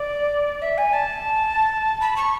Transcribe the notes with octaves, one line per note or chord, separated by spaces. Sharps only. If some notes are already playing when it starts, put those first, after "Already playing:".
Already playing: D5
E5
G#5
A5
B5
C#6